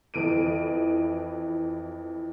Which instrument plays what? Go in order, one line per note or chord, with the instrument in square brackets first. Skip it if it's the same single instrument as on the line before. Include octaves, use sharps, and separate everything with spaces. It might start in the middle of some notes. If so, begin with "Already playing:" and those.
[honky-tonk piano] F2 E3 D7 D#7